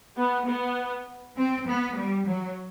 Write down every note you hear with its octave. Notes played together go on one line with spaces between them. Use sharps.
B3
B3
C4
B3
G3
F#3